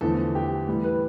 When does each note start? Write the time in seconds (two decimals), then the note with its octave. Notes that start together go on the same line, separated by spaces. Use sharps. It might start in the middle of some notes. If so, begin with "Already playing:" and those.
0.01 E2 D3 F3 A3 A4
0.35 G4
0.68 A2 E3 G3
0.84 B4